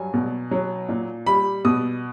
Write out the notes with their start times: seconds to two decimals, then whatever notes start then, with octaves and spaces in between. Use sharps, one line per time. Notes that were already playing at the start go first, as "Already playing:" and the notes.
Already playing: G2 F#3 G#5
0.14 B2
0.51 F#3
0.89 A#2
1.26 G3 B5
1.65 B2 D#6